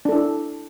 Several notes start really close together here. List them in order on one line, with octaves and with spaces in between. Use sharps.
D4 A4 E4